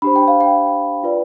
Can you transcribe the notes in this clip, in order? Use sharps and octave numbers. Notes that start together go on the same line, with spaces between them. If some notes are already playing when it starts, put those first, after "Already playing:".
D4 G4 C5 B5
G5
F5
G5
F4 B4 D5